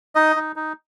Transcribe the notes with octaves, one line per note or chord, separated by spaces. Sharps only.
D#4 D#5
D#4
D#4